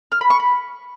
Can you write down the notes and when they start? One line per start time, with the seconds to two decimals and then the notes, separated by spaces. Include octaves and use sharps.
0.12 F6
0.21 B5
0.30 C#6
0.40 B5